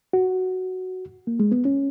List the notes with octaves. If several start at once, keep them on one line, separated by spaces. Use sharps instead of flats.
F#4
A#3
G#3
B3
C#4